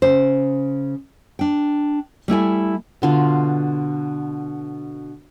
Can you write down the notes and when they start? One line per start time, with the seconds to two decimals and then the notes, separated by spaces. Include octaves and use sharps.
0.02 C#3 C5
1.39 D4 G5
2.28 G3 A3 E4 G#5
3.02 B2 D3 F4